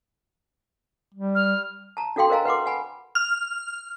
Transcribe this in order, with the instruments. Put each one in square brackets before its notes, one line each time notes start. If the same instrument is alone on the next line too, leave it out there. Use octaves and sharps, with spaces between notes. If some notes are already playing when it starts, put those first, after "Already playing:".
[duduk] G3
[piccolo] F6
[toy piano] A5 A#5
D4 F#4 A4 F5 G5 C6
A#4 C5 D#5 F5 G#5 A#5
B4 F#5 C6 D6
F#5 G#5 B5
[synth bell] F6